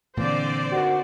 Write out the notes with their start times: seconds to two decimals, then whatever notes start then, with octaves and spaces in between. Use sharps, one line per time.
0.17 A#2 D3 E3 A#3 C4 C5 D5
0.72 B2 D#3 F#4